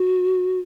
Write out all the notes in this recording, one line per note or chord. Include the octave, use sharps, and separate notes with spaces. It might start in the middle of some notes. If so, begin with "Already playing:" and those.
Already playing: F#4